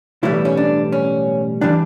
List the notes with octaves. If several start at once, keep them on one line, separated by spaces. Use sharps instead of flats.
B1 A2 E3 G3 E4
C#4
D4
C#4
E3 G3 D4